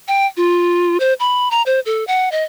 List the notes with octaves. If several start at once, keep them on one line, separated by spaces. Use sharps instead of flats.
G5
F4
C5
B5
A#5
C5
A4
F#5
D#5